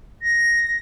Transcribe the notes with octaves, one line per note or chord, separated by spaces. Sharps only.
A#6